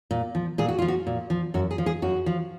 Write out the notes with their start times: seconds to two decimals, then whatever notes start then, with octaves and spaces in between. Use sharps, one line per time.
0.11 A#2
0.35 F3
0.58 A#2 G#4
0.68 F#4
0.79 F3 F4
0.88 F#4
1.07 A#2
1.30 F3
1.54 F#2 F#4
1.71 G#4
1.78 F3
1.86 G#4
2.02 F#2 F#4
2.26 F3